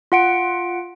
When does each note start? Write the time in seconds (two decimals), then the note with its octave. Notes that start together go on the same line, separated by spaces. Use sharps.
0.12 F4 F#5 D7